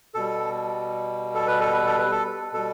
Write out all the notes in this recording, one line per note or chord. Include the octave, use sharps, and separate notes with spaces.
B2 G3 A4
A4
B4
A4
B4
A4
B4
A4
B2 G3 A4